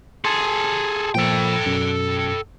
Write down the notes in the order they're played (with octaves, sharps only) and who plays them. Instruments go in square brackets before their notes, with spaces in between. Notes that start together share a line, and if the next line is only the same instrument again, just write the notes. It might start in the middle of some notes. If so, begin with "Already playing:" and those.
[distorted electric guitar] G#4 A4 [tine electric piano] A5 C6
[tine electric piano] A#2 F3 [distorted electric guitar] A4 G5
[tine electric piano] F#2 B2